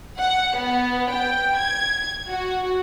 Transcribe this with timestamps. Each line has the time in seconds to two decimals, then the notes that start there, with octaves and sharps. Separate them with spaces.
0.19 F#5
0.56 B3
1.13 G5
1.59 G#6
2.28 F#4